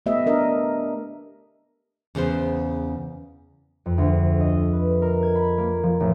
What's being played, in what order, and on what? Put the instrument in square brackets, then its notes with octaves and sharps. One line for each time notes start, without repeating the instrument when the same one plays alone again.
[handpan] A3 B3 G4 B4 D#5 E5
D4 A#4 D#5
[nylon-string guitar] E2 C#3 B3 C5
[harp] F2
D2
D#5
B4
A#4
G#6
B5
A#3
F3
A1